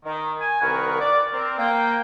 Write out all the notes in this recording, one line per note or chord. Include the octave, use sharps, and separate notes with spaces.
D#3
G#5
C2 D#3 A#4 B4 F#5 C#6
D5
C4 A#4
A#3 G5